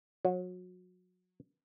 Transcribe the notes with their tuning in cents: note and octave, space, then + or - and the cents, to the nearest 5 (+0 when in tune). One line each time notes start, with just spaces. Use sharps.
F#3 -30